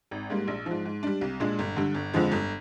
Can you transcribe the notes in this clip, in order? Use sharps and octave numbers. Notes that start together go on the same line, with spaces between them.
G#1
G#2 G3 A#3
A#1
G#2 F3
G#2
G3 D4
C2
A#2 G#3 D4
G1
G2 D3
G1
F2 D3 F3 G#3
G1